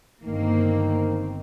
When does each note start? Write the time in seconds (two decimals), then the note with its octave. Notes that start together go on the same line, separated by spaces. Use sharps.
0.23 G1 G2 D#3 A#3 C4